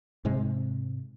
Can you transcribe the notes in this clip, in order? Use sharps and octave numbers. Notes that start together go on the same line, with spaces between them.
G#2 C3 G#3